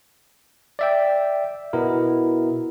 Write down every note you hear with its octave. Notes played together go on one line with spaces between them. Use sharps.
D5 E5 G5
B2 B3 E4 A#4